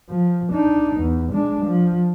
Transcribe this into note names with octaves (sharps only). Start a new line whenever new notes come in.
F3
D4 D#4
E2
G#3 D4
F3